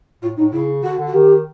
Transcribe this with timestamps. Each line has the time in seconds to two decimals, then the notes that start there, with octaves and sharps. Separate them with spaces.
0.22 A2 F4
0.37 A2 D#4
0.52 C#3 E4
0.83 D3 F#4
0.99 D3
1.07 F#4
1.14 D#3 G4